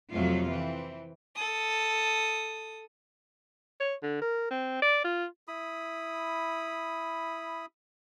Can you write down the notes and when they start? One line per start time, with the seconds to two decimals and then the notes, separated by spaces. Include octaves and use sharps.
0.10 F2 C3 F#3 A3 F4
0.49 E3 C4
1.35 A4 D#6
3.80 C#5
4.03 D3
4.21 A#4
4.51 C4
4.82 D5
5.04 F4
5.48 E4 B5 D#6